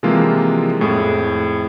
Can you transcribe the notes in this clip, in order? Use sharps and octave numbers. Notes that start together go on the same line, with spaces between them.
C3 E3 F3 G#3 A#3 F4
F2 A2 G#4